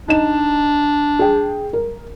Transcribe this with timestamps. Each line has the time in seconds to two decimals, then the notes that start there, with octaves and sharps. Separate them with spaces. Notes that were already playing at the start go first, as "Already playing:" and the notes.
0.08 D4 D#4 E7
1.19 G#4 G5
1.73 A#4